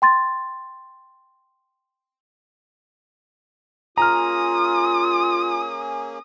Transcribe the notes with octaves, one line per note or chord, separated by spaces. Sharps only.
G5 C6 A6
A#3 C#4 F4 G#4 A#5 D#6 F6